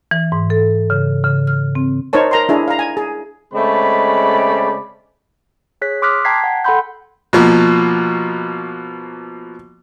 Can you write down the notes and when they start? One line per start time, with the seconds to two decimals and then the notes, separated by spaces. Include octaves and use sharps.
0.11 E3
0.32 G#2
0.50 A4
0.90 C#3
1.24 C#3
1.47 F6
1.75 C4
2.13 D#4 A#4 C5 C#5 A5
2.31 A#4 A#5 C6
2.49 D4 E4 G#4
2.68 F5 A#5
2.79 G#5
2.97 G#4
3.54 C#3 G#3 A3 C4 D5 B5
5.81 G#4 C#5 F#6 B6
6.02 C6 D6 D#6 F6 F#6 B6
6.25 G5 A5 A#5 G#6 B6 C7
6.44 F#5
6.64 A4 F#5 G5 B5 C6 G6
7.33 B2 F3 A#3